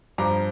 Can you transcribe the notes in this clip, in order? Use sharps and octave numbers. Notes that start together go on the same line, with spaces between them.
G2 F3 A#5 D6